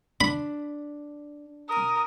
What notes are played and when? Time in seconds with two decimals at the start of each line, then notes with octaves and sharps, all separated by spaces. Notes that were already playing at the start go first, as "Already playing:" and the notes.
0.21 D4 B5
1.69 A#4 D#6